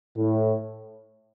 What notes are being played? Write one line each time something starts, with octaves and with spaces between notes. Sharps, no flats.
A2